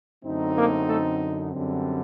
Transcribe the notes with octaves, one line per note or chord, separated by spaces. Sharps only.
F#2 D3 A3 C4 D#4
A#3 A#4
A3 A4
F#2 D3 G3 C4